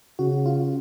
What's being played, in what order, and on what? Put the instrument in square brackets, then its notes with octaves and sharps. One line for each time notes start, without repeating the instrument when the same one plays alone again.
[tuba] C#3 [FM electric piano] F#4
[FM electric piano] F4